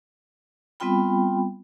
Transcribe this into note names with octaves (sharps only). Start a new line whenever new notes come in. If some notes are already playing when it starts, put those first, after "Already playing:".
G3 B3 C4 F4 G5 B5